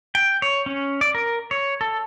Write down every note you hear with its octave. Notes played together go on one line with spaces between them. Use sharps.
G5
C#5
C#4
D5
A#4
C#5
A4